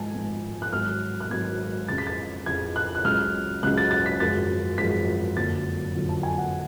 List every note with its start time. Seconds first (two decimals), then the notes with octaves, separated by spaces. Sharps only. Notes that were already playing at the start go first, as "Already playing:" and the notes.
Already playing: G#1 G#2 F3 G#5 A5
0.15 G#1 G#2 F3
0.62 F#6
0.73 G#1 G#2 F#3 F6
1.20 F#6
1.30 G#1 G#2 F#3 G#6
1.88 F2 C#3 G#3 A6
1.98 B6
2.07 A6
2.46 F2 C#3 G#3 G#6
2.76 F#6
2.95 F#6
3.04 C#2 C#3 F#3 F6
3.63 C#2 C#3 F#3 F#6
3.77 A6
3.91 A6
4.06 B6
4.20 G#1 F#2 F3 G#3 A6
4.78 G#1 F#2 F3 G#3 B6
5.36 F#1 F2 D3 F#3 A6
5.94 F#1 F2 D3 F#3
6.09 A5
6.23 G#5
6.38 F#5